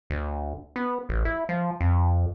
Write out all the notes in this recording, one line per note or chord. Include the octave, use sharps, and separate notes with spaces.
D2
B3
A1
E4
F3
F2